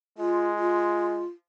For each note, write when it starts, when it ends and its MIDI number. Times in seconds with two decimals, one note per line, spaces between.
0.18 1.23 56
0.18 0.47 65
0.58 1.25 65